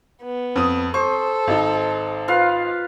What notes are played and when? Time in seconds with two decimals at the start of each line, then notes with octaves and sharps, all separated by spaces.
0.23 B3
0.56 F2 D#6
0.94 A4 C5 C#6
1.47 G#1 D#4
2.28 F4 B4 F5